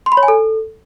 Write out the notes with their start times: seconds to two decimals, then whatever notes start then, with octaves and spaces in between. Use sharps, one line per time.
0.06 C6
0.12 B5
0.17 C#5
0.23 G#5
0.28 A4